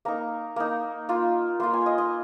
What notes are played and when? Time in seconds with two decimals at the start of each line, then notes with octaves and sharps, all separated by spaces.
0.05 A#3 D#4 A#5
0.56 A#3 D#4
1.09 A#3 F4
1.60 A#3 F4 C6
1.73 G#5
1.86 D#5
1.98 D#5